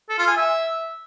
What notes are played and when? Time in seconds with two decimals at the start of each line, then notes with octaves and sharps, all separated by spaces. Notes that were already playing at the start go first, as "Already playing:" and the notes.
0.09 A4
0.19 F4
0.28 G#5
0.37 E5